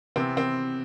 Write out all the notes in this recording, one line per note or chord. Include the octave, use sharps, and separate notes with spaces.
C3 E3 B3 C4
C4